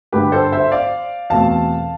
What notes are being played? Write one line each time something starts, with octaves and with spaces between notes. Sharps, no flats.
G2 D3 G3 G4 B4
A4 C5
C5 E5
D5 F5
E2 B2 A3 C4 F5 A5